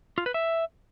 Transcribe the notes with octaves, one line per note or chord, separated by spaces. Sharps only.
F4
B4
E5